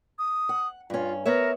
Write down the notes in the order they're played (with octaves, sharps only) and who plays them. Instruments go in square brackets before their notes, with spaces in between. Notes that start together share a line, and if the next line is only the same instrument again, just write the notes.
[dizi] D#6
[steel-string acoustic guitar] F#5
[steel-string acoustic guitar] G2 C#4 [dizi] F4
[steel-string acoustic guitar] B3 C#5 E5 [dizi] A#4